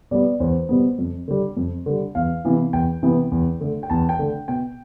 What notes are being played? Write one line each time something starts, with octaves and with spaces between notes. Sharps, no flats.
B2 G3 B3 D5
E2 C5
B2 G3 B3
F2
D3 G3
F2
D3 G3
E2 F5
C3 E3 B3
E2 G5
C3 E3 B3
E2
D3 A3
G5
E2 A5
G5
D3 A3
B2 G5